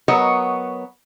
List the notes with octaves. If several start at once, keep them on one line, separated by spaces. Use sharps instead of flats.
F#3 B3 A#4 C#5 D#5